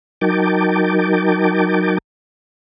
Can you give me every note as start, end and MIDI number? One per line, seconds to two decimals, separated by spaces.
0.21 1.98 54
0.21 1.98 63
0.21 1.98 70
0.21 1.98 79
0.21 1.98 81
0.21 1.98 86